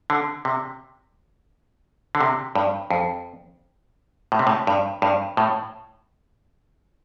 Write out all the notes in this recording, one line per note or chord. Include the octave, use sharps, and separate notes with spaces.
D3
C3
D3
C3
G2
F2
A2
C3
A2
G2
G2
A2